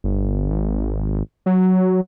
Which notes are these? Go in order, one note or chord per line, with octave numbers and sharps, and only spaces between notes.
G1
G#1
F#3